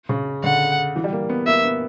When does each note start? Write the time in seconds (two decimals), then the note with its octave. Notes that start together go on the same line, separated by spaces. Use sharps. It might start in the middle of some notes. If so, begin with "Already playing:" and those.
0.09 C#3
0.44 D3 F#5
0.96 E3
1.04 G3
1.13 A#3
1.29 B3
1.46 A#3 E5
1.64 B3